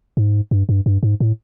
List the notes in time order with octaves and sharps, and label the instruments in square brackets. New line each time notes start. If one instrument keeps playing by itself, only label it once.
[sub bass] G#2
G2
G2
G2
G#2
A2